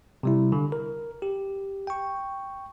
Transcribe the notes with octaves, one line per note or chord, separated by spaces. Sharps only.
C3 G3 E4
D3
A#4
G4
G5 C#6